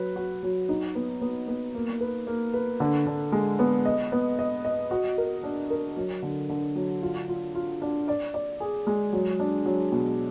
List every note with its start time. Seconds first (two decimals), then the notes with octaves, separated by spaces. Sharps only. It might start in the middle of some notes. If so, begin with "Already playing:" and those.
Already playing: F#3 B4
0.16 F#4
0.43 F#3
0.69 D#4
0.95 B3
1.21 B3
1.48 B3
1.75 A#3
2.01 B4
2.27 A#3
2.54 B4
2.80 D3
3.07 D3
3.32 G#3
3.59 B3
3.85 D#5
4.12 B3
4.39 D#5
4.65 D#5
4.91 F#4
5.18 A#4
5.43 D4
5.70 A#4
5.96 F#3
6.23 D3
6.49 D3
6.76 F#3
7.02 F4
7.28 F4
7.55 F4
7.82 D4
8.08 D5
8.34 D5
8.60 G#4
8.87 G#3
9.13 F#3
9.39 D4
9.65 F#3
9.92 B2